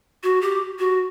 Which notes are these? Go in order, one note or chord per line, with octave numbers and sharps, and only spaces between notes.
F#4
G4
F#4